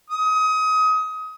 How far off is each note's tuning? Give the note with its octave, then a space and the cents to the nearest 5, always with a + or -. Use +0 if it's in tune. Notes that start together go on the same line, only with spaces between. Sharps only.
D#6 +25